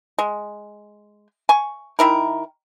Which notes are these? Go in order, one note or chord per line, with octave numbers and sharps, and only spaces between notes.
G#3
G#5 C#6
D#3 E4 A#4